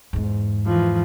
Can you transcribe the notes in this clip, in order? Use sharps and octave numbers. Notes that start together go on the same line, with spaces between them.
E2 G#2
E3 F3